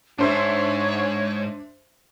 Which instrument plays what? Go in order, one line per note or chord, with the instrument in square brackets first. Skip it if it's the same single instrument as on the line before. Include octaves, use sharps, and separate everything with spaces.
[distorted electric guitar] G#2 [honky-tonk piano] D4 C5 E5 [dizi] C#5